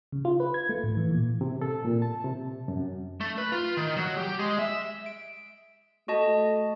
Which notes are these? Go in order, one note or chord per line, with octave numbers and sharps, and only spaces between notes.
C#3
F4
B4
G#6
A3
A2
E3
A#2
C3
A4
A#2
A5
C3
F#2
A3
B4
F4
D#3
F#3
G4
G#3
E5
D7
A3 F#4 D#5 A5